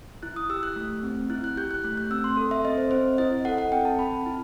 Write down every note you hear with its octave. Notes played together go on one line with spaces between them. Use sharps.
E4 F#6
D#6
G4 E6
F#6
A3
C4
E4 F#6
F#6
G4 G6
F#6
A3 F#6
F#6
C4 E6
C6
A4
E5
C4 D#5
C5
C4 C5
E4 D#5
A4 F#5
F#5
C4 G5
A5
C4 B5
E4